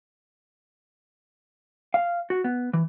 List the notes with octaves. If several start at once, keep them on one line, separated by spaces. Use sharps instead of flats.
F5
F#4
B3
E3